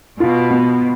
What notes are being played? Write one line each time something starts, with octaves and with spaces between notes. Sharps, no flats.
B2 F4
B3